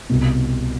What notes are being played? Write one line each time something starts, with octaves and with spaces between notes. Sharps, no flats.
C2 B2